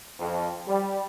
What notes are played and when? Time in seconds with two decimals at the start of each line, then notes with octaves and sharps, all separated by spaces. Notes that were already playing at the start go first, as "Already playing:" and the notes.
0.19 F2
0.66 G3